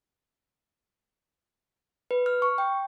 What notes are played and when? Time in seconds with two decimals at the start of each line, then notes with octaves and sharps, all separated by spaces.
2.11 B4
2.26 F6
2.42 C#6
2.58 G5